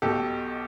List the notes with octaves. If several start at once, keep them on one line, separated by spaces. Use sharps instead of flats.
B1 B2 G4 A4